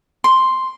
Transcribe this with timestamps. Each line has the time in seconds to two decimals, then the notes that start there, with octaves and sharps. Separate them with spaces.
0.24 C6